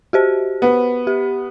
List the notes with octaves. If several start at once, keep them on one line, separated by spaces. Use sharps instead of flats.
F#4 G4 C5
B3
G4